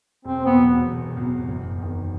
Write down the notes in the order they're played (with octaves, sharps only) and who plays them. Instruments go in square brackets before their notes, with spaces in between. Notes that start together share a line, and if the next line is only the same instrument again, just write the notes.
[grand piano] E1 [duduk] C4
[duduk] B3
[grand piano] E2 C3 F#3
E1
E2 C3 F#3
F#1
E2 D#3